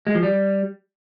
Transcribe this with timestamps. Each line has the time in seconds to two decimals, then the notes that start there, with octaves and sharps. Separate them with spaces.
0.07 G#3
0.15 F3
0.23 G3